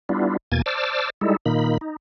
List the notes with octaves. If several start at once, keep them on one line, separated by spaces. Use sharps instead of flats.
G3 B3 D4 E4 F4
E2 B2 A#3 G#5 G#6 A6
C5 D5 A5 D6 E6 F6
G3 G#3 D#4 E4 A4
A#2 D#3 A#3 D#4 B5
D#4